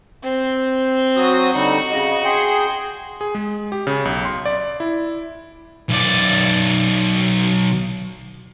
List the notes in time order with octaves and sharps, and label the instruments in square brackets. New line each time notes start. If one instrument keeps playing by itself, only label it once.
[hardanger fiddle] C4
[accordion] F#3 F#4 D#6
[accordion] D3 G3 D#4 [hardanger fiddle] F#4
[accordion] C#3 D#5
G#4 G5 C6
[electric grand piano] G#4
G#3
G4
C#3
B1
C6
D5
E4
[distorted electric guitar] B1 D5